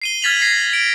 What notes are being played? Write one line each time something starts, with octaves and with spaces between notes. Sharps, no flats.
C7 D#7 G7
F6 G#6 A6 B6 F7 F#7
G#6 A#6 C7
D7